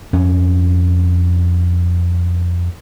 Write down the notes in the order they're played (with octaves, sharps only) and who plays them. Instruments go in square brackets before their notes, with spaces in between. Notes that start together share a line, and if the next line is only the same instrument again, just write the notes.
[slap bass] F2 C#4